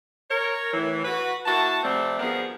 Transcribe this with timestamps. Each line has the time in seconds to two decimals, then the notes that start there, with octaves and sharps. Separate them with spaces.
0.30 A#4 C#5
0.74 A2 E3
1.05 F#4 B4
1.46 A#3 E4 F#4 F#5 A5
1.83 C3 F3 G3 A3 C4
2.20 G2 B2 F3 B3 G#4 A#4